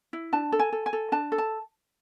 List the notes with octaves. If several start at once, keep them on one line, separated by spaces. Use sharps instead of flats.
E4
D4 A5
A4
G#5
A4
G#5
A4
D4 A5
A4
A5